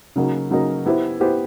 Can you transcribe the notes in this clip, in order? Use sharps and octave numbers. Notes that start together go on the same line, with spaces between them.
C#3 F#3 A#3 D#4
C#3 F#3 A#3 D#4
B3 E4 G4 C5
B3 E4 G4 C5